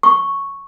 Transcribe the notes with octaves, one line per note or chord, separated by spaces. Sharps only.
C#6